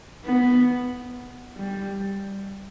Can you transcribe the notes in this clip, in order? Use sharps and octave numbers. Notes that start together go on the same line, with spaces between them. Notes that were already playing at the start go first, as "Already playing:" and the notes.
B3
G3